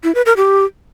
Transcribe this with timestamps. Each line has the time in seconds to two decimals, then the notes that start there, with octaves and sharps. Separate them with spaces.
0.04 E4
0.15 B4
0.26 A#4
0.37 G4